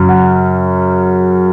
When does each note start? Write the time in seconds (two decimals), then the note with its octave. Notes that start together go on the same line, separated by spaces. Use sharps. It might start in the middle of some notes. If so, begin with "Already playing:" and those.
Already playing: F#2 C#3
0.09 F#5